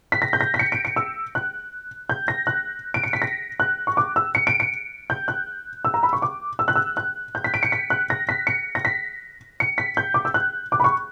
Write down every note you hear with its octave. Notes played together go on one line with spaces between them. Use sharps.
B6
A#6
G6
A#6
B6
C#7
D7
C#7
E6
F#6
G6
A#6
F#6
D7
C#7
B6
A#6
F#6
C#6
D6
E6
C#7
D7
C#7
G6
F#6
E6
A#5
B5
C#6
D6
E6
F#6
E6
F#6
G6
B6
D7
C#7
B6
F#6
A#6
B6
C#7
A#6
B6
C#7
B6
G6
D6
E6
F#6
D6
B5
C#6